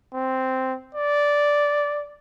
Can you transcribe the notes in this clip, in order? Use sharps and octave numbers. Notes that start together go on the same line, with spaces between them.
C4
D5